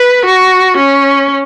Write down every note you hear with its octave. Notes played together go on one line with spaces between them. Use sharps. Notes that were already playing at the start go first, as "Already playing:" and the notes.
Already playing: B4
F#4
C#4